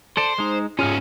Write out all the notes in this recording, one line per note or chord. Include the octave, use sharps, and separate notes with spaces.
A4 C5 D5 A5
G#3 D#4
G#2 C#4 F4 G#4 F6